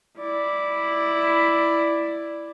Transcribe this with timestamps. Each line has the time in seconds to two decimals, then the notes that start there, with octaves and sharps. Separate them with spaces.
0.18 E4 D5